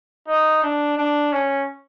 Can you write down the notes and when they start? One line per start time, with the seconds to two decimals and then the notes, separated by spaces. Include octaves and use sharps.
0.28 D#4
0.63 D4
0.98 D4
1.32 C#4